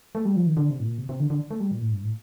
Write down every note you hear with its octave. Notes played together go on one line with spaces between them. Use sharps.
A3
G3
F3
D#3
D3
C3
A2
A#2
C3
C3
D3
D3
A3
G3
A#2
A2
G2
A2